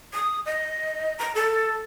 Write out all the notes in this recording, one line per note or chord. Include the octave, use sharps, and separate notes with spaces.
D#6
D#5
A#5
A4